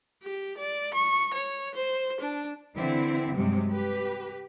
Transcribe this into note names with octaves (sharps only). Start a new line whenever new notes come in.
G4
D5
C#6
C#5
C5
D4
D3 E3 C4 E4
G2 C3 F#3 G#3
G4 B4